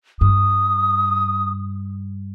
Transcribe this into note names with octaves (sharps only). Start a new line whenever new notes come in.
G2 D#6